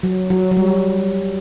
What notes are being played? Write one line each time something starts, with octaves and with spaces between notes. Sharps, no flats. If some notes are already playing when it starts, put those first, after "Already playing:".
F#3
F#3
F#3
G3